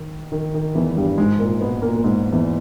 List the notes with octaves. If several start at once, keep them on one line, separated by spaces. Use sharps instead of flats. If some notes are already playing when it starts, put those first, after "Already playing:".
Already playing: D#3
D#3
D#3
E2 E3
G2 G3
G#2 G#3
A#2 A#3
B2 B3
A#2 A#3
A#3
G#2 G#3
E2 E3